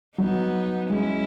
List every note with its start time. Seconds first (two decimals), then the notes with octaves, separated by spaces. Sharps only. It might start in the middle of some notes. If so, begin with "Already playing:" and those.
0.17 F#3 B3 D#4
0.90 G#3 C#4 E4